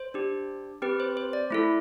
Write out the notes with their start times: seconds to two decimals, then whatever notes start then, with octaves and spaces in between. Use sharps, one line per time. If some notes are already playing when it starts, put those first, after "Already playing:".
Already playing: C5
0.14 D4 G4
0.82 C4 G4 B4
1.00 C5
1.17 C5
1.33 D5
1.51 A3 E4 A4